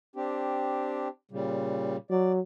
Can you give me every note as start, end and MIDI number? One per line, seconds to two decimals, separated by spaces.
0.16 1.08 60
0.16 1.08 62
0.16 1.08 67
1.31 1.97 46
1.31 1.97 49
1.31 1.97 55
2.10 2.40 54
2.10 2.32 74